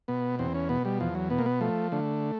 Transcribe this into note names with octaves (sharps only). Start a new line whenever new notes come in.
B2 B3
E2 C4
C#4
B2 B3
G3
E2 F3
F#3
B2 B3
A#3
B3
F3 A3
D3 A3